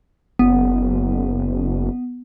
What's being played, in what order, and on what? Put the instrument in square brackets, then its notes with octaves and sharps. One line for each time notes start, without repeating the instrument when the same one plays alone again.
[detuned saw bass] F#1 [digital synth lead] B3